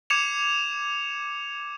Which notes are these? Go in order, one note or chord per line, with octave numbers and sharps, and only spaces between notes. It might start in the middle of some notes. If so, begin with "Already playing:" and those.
D6 G#6 C#7 E7 F7